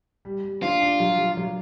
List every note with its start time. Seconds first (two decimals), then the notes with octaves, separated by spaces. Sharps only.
0.25 G3
0.44 G3
0.62 D4 F4
0.81 D4
1.00 F#3
1.19 F#3
1.37 F#3